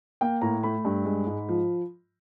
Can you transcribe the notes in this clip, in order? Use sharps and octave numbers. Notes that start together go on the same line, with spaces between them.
A#3 G5
A2 A#5
A3 B5
G2
G#3
G#2
F3